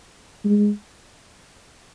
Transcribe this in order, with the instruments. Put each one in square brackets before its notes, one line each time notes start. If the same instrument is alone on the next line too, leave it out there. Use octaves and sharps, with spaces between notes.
[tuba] G#3